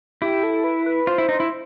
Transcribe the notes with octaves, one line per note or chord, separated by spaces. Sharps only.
E4 G4
A4
B4
B4
F4 C5
E4
D#4
E4